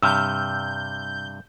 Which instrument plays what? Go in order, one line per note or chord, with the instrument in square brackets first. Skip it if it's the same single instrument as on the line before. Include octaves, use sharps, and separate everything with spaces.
[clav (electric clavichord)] G2 C3 [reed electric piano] E6 F6 [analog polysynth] G6